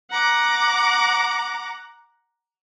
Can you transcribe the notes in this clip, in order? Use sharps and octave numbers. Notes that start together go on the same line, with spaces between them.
F#5 A#5 D6